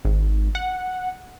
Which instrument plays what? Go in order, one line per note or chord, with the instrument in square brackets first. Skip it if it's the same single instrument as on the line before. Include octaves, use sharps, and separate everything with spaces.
[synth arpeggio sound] G#1
F#5